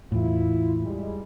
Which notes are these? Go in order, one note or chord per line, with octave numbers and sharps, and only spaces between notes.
E2 A2 E4 F4
G3 G#3